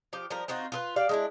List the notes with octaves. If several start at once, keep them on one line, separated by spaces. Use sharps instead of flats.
F3 G4
F3 G3 A#4
C4 D#4 F4 F#4
F4 G#4 B4
G4 D5 F5
G#3 D4 E4